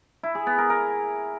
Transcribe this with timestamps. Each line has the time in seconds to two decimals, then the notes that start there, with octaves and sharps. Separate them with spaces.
0.23 E4
0.35 G#4
0.47 B3
0.58 A#4
0.70 A#4